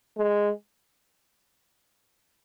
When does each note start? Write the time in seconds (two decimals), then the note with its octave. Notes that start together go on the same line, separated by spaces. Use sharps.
0.18 G#3